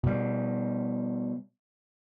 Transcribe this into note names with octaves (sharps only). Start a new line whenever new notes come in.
B2 G3